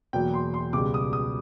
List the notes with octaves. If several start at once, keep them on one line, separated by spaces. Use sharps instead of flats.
E2 B2 F#3 A#3 G5
C6
C6
C#2 B2 G3 D6
D#6
D#6